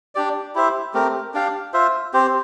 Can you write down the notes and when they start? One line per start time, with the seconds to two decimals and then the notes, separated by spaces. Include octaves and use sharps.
0.15 D4 G4 D5
0.55 E4 G4 C5 E5
0.94 A3 C4 G4 A#4
1.34 D4 G4 D5 F5
1.73 F4 C5 E5
2.13 C4 G4 C5